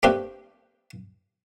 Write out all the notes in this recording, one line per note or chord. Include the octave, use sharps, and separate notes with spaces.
A3 A#3 C4 D4 G4 B4